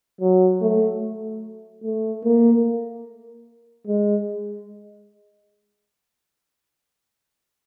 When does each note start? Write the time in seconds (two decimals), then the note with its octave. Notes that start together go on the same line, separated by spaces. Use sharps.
0.21 F#3
0.62 A3
1.84 A3
2.24 A#3
3.87 G#3